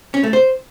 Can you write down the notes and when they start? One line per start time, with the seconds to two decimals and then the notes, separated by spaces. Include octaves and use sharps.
0.14 C#4
0.23 A3
0.33 C5